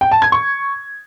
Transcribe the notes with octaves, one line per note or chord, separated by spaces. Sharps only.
G5
A5
G#6
C#6